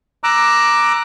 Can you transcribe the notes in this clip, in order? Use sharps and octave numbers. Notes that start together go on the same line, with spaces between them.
A#5 D6 E6 F#6